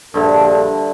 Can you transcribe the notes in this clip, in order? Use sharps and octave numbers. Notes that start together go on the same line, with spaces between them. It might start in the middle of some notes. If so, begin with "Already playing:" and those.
A#1 G2 D3 E4 A4